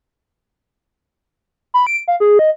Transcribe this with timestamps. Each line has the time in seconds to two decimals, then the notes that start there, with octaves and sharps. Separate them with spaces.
1.74 B5
1.87 D7
2.08 F5
2.20 G#4
2.39 D#5